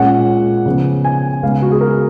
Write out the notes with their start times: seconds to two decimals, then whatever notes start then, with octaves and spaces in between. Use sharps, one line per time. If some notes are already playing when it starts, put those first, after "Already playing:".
Already playing: A#2 G#3 C#4 F#5
0.66 C#3 F3 B3
1.05 G#5
1.43 C#3 G#3 B3 F5
1.62 F#4
1.72 G#4
1.81 A#4